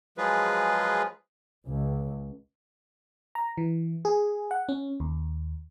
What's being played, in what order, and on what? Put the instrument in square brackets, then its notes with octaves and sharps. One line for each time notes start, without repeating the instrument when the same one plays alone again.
[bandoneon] F3 F#3 G#3 F4 G#4 B4
[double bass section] C#2
[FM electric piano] A#5
E3
G#4
F#5
C#4
D#2